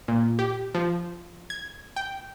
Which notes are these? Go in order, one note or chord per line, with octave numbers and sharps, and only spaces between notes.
A#2
G4
F3
G#6
G5